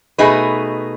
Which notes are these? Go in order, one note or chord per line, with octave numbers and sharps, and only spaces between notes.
B2 A3 D#4 G#4 B4